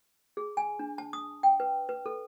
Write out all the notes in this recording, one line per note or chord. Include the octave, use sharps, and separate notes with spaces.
G#4
G#5
D4
A5
D#6
G5
B4
B4
A4